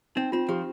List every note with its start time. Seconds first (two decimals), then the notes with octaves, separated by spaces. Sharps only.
0.16 C4 D#4
0.32 C4 F4
0.49 F3 G4